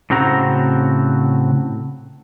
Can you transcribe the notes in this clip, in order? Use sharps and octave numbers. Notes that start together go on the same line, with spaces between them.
A2 C#3 C4 F#4 A#5